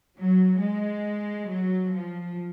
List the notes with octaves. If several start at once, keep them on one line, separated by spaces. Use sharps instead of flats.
F#3
G#3
F#3
F3